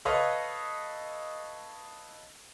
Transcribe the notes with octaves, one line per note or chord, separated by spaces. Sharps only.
A4 B4 C#5 D#5 F5